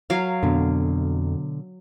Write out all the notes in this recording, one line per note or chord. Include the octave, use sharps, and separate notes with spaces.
F#3 A#4 F5
F2 B2 D3